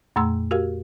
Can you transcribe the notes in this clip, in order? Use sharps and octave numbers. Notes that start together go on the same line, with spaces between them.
F2 A#2 A3 A#5 C6 E6
F#4 G4 A#4 F5